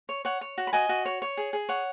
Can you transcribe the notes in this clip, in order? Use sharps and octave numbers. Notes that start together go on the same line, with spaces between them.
C#5
C#5 F#5
C#5
F#4
B5
F#4 D#5 G#5
F#4
C#5
C#5
G#4
G#4
C#5 F#5